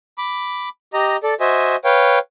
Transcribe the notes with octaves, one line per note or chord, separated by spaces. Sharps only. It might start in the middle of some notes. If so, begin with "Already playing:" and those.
B5 D6
G4 D#5 A#5
A4 D5
F#4 C5 D#5 E5 G#5
B4 C#5 F5 G5